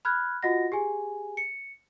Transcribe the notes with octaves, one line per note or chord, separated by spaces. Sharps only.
B5 F6 F#6 G#6
F4 F#4 D#5 F#5 A#6
G4 G#4 G#5
C#7